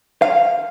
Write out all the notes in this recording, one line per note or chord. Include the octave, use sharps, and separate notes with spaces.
F5